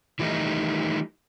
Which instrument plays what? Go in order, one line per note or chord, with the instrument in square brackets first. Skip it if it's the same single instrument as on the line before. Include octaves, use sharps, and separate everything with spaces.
[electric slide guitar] D#3 E3 G3 A3 D#4